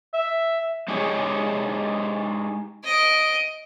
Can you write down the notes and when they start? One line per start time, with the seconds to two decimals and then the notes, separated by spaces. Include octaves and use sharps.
0.14 E5
0.88 G#3 D#4 G4 G#4 C#5
2.84 D#5 D7